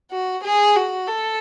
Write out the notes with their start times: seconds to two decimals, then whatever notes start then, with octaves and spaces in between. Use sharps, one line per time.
0.11 F#4
0.44 G#4
0.76 F#4
1.08 A4